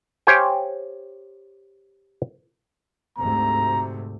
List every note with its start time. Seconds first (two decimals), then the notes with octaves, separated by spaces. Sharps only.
0.27 G4 C5 C#5 F5 G5 G#5
3.18 D2 G#2 C3 A#5